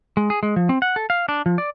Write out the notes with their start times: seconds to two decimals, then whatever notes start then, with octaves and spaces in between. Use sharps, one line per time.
0.17 G#3
0.30 G#4
0.43 G#3
0.56 F3
0.69 C4
0.82 F#5
0.96 A4
1.10 F5
1.29 D4
1.46 F3
1.58 D5